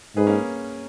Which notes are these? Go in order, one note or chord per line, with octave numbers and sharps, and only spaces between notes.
G#2 G#4 B4
A#3 C#4